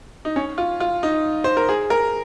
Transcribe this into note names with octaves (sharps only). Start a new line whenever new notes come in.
D#4
C#4
F4
F4
D#4
C5
A#4
G#4
A#4